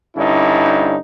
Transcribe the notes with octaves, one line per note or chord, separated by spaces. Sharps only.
G2 D3 C#4 D#4 E4